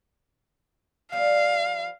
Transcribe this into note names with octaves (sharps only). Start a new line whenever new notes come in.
F3 G3 B3 F5